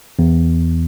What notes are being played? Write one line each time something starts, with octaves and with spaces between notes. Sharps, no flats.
E2